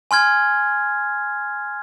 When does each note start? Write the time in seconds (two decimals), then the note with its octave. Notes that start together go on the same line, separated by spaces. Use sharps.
0.11 G#5 C6 F6 G#6